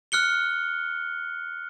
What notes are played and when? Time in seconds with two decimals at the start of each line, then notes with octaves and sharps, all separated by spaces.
0.12 F6 F#6 C#7 G7